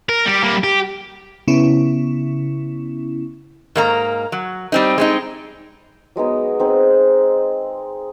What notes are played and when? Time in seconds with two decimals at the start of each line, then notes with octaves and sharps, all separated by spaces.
0.09 A#4
0.26 G3 G4
0.43 G3 A#3
0.64 G4
1.48 C#3 B3 C#4 E4
3.76 G#2 A#3 A#5
4.32 F#3
4.72 G3 C4 D#4
4.98 G#3 C4 D#4
6.16 F#3 G#3 B3 D#4
6.60 C4 D#4 G#4